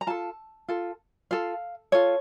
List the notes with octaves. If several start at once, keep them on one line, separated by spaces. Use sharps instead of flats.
A#5
F4 A4 A5
F4 A4
F4 A4 F5
F4 A4 C#5